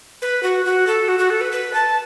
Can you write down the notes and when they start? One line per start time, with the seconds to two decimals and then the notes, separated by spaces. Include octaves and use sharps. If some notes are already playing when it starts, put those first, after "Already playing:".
0.22 B4
0.43 F#4
0.65 F#4
0.87 A4
1.08 F#4
1.19 F#4
1.30 A4
1.41 B4
1.52 B4
1.74 A5